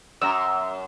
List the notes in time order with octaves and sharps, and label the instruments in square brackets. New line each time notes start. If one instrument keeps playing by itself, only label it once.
[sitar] F#2 [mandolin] A#5 E6